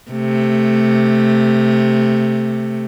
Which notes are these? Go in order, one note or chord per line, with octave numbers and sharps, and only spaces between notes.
C3 A3